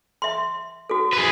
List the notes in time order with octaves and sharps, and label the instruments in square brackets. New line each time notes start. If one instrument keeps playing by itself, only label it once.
[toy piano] E5 C6
F#4 A4
[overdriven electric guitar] G#4 B4